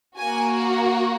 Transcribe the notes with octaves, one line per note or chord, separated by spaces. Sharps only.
A#3 F#4 G#5